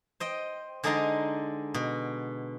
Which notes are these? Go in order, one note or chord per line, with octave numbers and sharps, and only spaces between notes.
C5 D#5 G5
D3 G#3 D4 D#4 D#5 A#5
B2